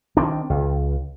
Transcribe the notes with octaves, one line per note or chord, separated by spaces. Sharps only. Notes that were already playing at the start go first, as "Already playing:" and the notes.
D#3 C4 D4
C#2